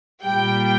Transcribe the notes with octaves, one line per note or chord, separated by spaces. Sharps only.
A#2 G3 G5